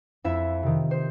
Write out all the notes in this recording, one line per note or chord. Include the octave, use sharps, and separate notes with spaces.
F2 E4 E5
C3 D#3
C5